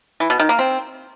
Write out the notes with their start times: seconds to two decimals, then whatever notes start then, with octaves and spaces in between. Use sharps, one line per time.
0.20 E3
0.30 B2
0.40 D#3
0.49 A#3
0.59 C4